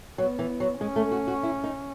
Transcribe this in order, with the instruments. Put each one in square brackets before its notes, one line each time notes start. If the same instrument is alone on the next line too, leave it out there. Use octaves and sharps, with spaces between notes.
[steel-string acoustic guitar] F#3 [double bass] B3
[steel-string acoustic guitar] E3
F#3
[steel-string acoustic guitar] G#3 [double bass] C#4
[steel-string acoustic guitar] A3
F#4
F#4
E4
D#4